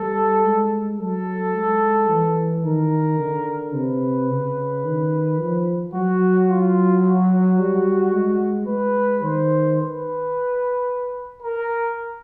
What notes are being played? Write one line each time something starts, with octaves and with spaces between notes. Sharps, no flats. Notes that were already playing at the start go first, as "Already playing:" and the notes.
Already playing: G3 A4
G#3
F#3 A4
G#3
E3
D#3 A#4
D3
C3 B4
C#3
D#3
F3
F#3 F#4
F4
F#4
G3
G#3
G#3 B4
D#3 C5
B4
A#4